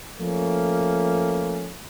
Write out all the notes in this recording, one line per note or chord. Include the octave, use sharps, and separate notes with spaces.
F3 A3 A#3 C#4